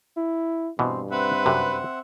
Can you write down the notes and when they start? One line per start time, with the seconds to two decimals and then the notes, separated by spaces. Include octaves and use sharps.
0.17 E4
0.79 G2 B2 E3 C4
1.11 C4 B4 E5 F#5
1.46 F#2 C3